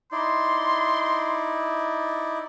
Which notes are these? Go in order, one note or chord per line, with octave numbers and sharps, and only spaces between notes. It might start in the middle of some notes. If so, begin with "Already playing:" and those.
D#4 E4 D5 C6